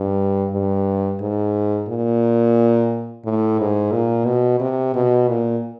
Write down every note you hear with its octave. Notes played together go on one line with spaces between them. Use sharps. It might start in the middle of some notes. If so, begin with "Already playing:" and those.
Already playing: G2
G2
G#2
A#2
A2
G#2
A#2
B2
C3
B2
A#2